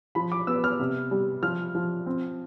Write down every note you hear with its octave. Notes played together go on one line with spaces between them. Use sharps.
F3 B5
D6
B3 E6
F6
C3
G3
F3 F6
F3
C4